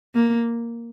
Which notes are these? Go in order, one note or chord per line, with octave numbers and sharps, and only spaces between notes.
A#3